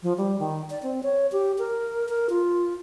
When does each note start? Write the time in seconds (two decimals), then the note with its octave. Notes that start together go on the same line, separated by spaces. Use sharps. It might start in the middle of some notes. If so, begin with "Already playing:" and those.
0.03 F3
0.18 G3
0.39 D#3
0.70 D5
0.83 C4
1.03 C#5
1.32 G4
1.59 A#4
2.09 A#4
2.30 F4